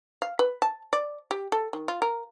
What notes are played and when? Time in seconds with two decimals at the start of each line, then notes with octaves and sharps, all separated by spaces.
0.22 F5
0.39 B4
0.62 A5
0.93 D5
1.31 G4
1.52 A4
1.73 D#3
1.88 F4
2.02 A#4